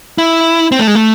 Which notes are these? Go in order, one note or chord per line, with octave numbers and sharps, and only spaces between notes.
E4
C4
A3
G#3
A3